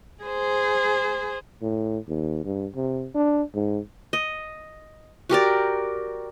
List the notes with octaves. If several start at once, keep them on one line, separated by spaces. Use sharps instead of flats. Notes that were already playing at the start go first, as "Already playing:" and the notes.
G#4 C5
A2
D#2
G2
C3
D4
G#2
D#5
F#4 G4 A#4 D5